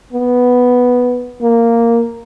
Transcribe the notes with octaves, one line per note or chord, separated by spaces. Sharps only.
B3
A#3